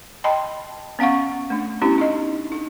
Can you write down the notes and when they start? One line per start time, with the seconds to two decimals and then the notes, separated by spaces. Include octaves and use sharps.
0.24 D#5 G5 A5 B5 C6
0.99 B3 C#4 F5 F#5 C#6
1.50 A3 D4
1.82 B3 C#4 D4 E4 G4
1.98 D#4 D#5
2.52 D#4